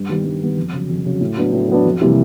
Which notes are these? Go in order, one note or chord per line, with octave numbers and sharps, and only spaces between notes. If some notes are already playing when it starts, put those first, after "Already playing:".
Already playing: G2
D#3 G3 B3
G2
D#3 G3 B3
F2
C#3 F#3
F2
C#3 F#3
A2
F#3 B3 D4
A2
F#3 B3 D4
F2
C3 E3 G3 A#3